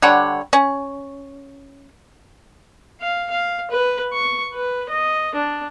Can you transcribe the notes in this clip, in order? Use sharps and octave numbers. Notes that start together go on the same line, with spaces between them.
D3 G3 C#5 F#5
C#4
F5
F5
B4
C#6
B4
D#5
D4